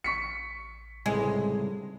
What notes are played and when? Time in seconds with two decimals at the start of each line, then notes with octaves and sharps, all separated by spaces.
0.04 A1 C#6 B6 C#7
1.06 C#2 A2 C3 G3 G#3